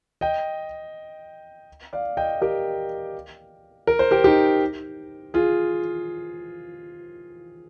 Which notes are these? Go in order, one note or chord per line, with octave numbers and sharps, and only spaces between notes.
D#5 G5
D5 F5
D#5 G5
G4 A#4
A#4
C5
G4 A#4
D#4 G4
F4 G#4